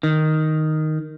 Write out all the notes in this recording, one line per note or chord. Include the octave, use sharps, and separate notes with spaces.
D#3